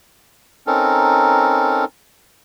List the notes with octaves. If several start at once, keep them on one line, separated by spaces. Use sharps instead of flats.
C4 C#4 D#4 A4 A#4